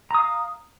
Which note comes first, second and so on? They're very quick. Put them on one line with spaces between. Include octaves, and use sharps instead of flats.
A#5 D#6 F5